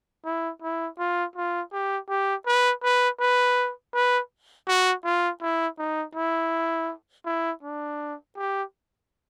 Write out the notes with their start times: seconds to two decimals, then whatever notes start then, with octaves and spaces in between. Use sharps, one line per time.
0.25 E4
0.62 E4
0.99 F4
1.36 F4
1.73 G4
2.09 G4
2.46 B4
2.83 B4
3.20 B4
3.94 B4
4.68 F#4
5.04 F4
5.42 E4
5.78 D#4
6.15 E4
7.26 E4
7.63 D4
8.37 G4